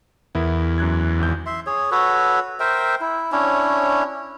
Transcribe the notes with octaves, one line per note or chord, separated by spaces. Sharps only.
E2 B3 E4 A#4
F#2 F#6 G#6
G#1 G6
E5 C6
G#4 C#5
F#4 A4 B4 C#5
A#4 C5 E5 G5
E4
C#4 D4 E4 C#5